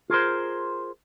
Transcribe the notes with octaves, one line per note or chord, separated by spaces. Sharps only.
F4 G#4 A#4 C5